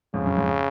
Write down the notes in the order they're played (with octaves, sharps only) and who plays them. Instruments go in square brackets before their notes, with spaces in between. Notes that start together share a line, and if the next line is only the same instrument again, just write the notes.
[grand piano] F2 G#2 [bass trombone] C#3
[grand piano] F#2
F2 G#2